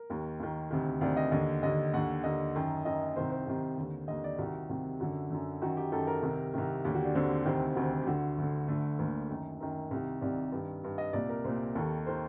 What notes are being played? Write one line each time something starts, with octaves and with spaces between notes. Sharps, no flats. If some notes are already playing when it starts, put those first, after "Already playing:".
Already playing: A#4
D#2 D#3
D#2 D#3
D2 C3 D#3
D2 C3 D#3 D5
D#5
D#2 D3 D#5
D#2 D3 D#5
D#2 D3 F#5
D#2 D3 D#5
F#2 D#3
F#2 D#3 D#5
C2 C3 D#3 C5
C5
C2 C3 D#3
D#2 D3
D#2 D3 D#5
D5
C2 C3 D#3 F#4
C2 C3 D#3
F#2 D3 F#4
F#2 D3
F#2 D#3 F#4
G4
F#2 D#3 A4
A#4
C2 C3 D#3
C2 C3 D#3
D#2 D3 G4
F#4
D4
D#2 D3 C4
D2 C3 D#3 C4
D2 C3 D#3 F#4
G4
D2 D3 F#4
D2 D3
D2 D3 A3
D2 D3 A#3
F#2 D#3
F#2 D#3 A#4
C2 C3 D#3
C2 C3 D#3 D5
G2 D#3
G2 D#3
D#5
C2 A#2 D5
A#4
C2 A#2 C5
D#2 D#3 A4
D#3 C5